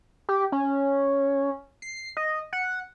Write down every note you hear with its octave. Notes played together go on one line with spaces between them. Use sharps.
G4
C#4
C7
D#5
F#5